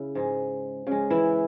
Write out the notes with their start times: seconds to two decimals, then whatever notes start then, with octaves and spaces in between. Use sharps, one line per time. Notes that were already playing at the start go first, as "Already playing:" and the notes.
Already playing: C#3 E4
0.15 G#2 G#3
0.87 C#3 G#3
1.10 E3 E4